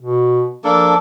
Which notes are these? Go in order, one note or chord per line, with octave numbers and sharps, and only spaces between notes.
B2
F3 A#3 D4 A4